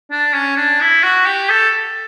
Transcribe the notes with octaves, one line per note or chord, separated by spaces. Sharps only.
D4
C#4
D4
E4
F#4
G4
A4